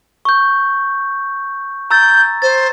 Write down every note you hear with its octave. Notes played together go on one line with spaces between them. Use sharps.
C#6 G6
A#5 E6 G6 A6
C5 A6